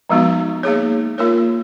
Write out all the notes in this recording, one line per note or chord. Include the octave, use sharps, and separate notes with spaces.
F3 G#3 B3 D#4 F#4
A#3 D#4 G#4 C#5
A#3 F4 A#4 C#5